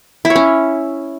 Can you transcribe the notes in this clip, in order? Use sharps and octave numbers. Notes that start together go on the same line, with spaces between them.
E4
C#5
C#4